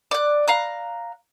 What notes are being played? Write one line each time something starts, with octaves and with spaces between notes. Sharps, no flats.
D5 F#6
F5 A#5 F#6